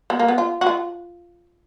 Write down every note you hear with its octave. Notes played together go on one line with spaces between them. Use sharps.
B3
A#3
B3
F4
F#4
F4